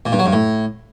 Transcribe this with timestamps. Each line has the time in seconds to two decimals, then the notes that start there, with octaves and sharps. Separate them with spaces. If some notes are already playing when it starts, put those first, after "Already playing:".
0.06 A#2
0.12 G2
0.19 F#3
0.26 G2
0.33 A2